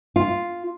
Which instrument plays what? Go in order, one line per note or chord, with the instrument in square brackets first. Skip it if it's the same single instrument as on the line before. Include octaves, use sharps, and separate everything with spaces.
[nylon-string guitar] F4